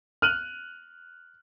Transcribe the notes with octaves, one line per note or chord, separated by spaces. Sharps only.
F6 F#6 D#7 F#7